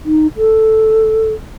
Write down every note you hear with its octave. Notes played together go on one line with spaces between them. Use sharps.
D#4
A4